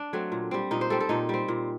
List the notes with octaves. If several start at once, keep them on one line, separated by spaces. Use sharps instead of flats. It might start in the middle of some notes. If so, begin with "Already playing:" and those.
Already playing: D4
F#3 A3 C4
A#2
G3 C4
A#2 D#4
C5
G3 C4 A4
A4
A#2 D#4
G3 C4
A#2